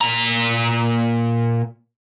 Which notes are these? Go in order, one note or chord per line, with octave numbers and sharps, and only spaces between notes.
A#2 A#5